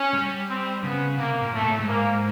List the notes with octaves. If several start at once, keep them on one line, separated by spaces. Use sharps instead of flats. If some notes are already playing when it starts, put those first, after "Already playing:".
Already playing: C#4
G3
C4
C#3 B3
C3 A#3
A#2
A2 A3
A#2
A2
G#2
A#3